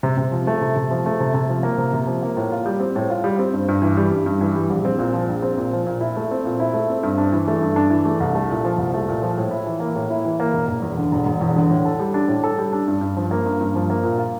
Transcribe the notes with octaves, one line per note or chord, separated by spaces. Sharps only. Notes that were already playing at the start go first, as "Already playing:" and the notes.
C3
C3
F3
A3
C3
C3
F3
A3
C3
C3
F3
A#3
C3
C3
F3
A#3
A2
F4
G3
C4
A2
F4
G3
C4
G2
G2
E3
G3
G2
G2
E3
G3
A#1
C4
A#2
F3
A#1
C4
A#2
F3
A#2
E4
A3
C4
A#2
E4
A3
C4
G2
D4
E3
A3
G2
D4
E3
A3
C2
A3
A#2
F3
C2
A3
A#2
F3
A2
E4
E3
A#3
A2
E4
E3
A#3
E1
E1
E2
D3
E1
E1
E2
D3
A2
A4
G3
D4
A2
A4
G3
D4
G2
G2
F3
A#3
G2
G2
F3
A#3
A#2
F4